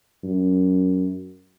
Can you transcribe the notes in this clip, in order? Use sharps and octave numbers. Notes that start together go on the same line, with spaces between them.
F#2